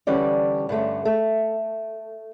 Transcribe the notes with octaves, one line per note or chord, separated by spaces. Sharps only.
D3 E3 G3 C#4 D5
G2 D3 A3 C#4
A3